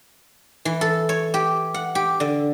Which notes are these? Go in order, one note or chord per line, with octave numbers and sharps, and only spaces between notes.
E3
A4
C#5
G4
F#5
G4
D3